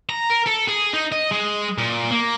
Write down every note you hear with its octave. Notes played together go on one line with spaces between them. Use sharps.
A#5
A#4
A4
G#4
D#4
D#5
G#3
A#2
A#3